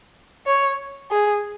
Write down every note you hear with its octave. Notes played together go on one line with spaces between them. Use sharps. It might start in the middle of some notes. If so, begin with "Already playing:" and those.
C#5
G#4